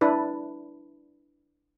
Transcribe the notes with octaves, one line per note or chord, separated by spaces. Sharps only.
D4 E4 B4